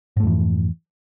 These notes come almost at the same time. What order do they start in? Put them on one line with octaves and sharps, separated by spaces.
G#2 A3 F2 E3